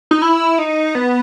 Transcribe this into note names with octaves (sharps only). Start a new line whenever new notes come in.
D#4
E4
D#4
B3